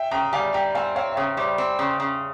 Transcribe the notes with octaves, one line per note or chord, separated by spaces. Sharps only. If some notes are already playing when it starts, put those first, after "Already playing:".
Already playing: E5 G5
C#3 G5 A#5
G3 F5 G#5
G3 G5 A#5
C4 F5 G#5
C4 C#5 F5
E5
C#3 C#5 F5
G3 C5 E5
C4
C#3
C#3